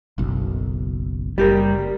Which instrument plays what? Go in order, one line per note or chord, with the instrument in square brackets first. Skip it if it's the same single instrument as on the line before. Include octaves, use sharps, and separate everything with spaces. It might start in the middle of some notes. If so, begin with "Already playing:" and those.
[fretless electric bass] F#1 B1
[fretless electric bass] F#1 [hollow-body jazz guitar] G3 G4 A#4